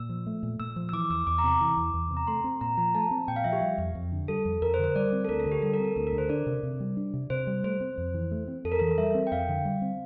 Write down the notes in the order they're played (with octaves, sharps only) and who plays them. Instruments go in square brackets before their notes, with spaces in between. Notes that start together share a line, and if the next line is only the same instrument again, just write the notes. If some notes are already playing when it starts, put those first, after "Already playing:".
Already playing: [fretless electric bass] A#2 [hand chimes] E6
[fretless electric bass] F3
A3
A#2
[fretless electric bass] A#2 [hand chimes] E6
[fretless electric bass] F3
[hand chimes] E6
[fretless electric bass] E3 [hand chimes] D6
[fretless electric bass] E2 [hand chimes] E6
[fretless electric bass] E2 [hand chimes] D6
[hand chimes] A#5
[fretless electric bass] C3
[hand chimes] D6
[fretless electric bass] E3
E2
E2
C3
[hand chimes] A#5
[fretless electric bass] A3 [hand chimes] C6
[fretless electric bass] C4
[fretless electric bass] A#2 [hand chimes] A#5
[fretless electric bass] F3 [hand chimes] A#5
[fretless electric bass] A3 [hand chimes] A5
[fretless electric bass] C4
[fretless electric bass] A#2 [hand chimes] G5
[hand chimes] F5
[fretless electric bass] F3 [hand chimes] E5
[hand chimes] G4
[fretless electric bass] G3
F2
F2
D3
[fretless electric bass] G3 [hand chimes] A4
[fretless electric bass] F2
[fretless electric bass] F2 [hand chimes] A#4
[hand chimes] C5
[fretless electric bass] D3
[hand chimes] C5
[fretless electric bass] G3 [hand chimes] D5
[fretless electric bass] C4
[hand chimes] A4
[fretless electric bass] D2 [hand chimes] A#4
[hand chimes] A4
[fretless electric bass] D3
[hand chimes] G4
[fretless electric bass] G3 [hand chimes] A4
[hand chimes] A#4
[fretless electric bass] C4
[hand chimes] A4
[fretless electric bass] D2 [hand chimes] A4
[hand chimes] A#4
[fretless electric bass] D3
[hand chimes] C5
[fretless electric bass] D4 [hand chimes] D5
[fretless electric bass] C3
C3
G3
D4
C3
[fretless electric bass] C3 [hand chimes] C5
[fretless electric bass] G3
[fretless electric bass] A3 [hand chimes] C5
[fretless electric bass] C4
F2
E3
A3
C4
[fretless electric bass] F2 [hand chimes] A4
[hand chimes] A#4
[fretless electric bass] E3 [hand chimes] A4
[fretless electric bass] G3 [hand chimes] E5
[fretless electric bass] C4
[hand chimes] G5
[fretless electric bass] F2 [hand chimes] F5
[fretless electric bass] D3
G3
C4